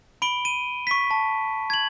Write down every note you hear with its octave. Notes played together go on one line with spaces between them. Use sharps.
B5 D7 G7
D#7
C#6 B6
A5
G#6 F#7